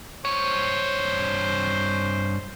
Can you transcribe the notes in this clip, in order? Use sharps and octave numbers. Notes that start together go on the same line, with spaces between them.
G2 C5 C#5